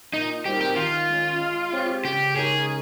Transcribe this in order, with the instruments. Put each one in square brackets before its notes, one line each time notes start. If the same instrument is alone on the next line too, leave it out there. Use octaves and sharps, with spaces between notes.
[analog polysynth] A#2 [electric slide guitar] D#4
[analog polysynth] G3 C4 D#4 A#4 [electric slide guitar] G4
[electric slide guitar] G4
[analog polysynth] D#3 [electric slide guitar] F4
[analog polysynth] G#3 C#4
G#3
C4 G4 C#5
[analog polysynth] C#3 [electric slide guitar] G4
[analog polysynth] G#3 D#4 A#4 C#5 [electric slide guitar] G#4